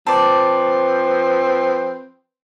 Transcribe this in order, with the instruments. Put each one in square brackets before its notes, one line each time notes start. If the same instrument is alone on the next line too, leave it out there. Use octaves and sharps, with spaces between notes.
[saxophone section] F3 C4 B4 [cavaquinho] D5 A5